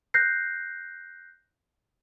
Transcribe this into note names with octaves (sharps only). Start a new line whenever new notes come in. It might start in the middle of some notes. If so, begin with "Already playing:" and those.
F#6 G6 A#6 C7